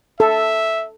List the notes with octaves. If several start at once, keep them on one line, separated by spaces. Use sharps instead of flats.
A4 E5